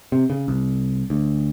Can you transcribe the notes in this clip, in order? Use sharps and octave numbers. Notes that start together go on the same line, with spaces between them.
C3
C#3
C2
D2